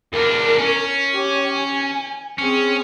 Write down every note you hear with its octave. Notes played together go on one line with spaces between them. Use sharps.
E2 D4 A#4
C#4
G4 C#5
G#5
C4 C#4 G#4